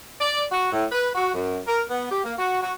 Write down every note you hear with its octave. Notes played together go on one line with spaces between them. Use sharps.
D5
F#4
A2
B4
F#4
F#2
A#4
B3
G4
A#3
F#4
F#4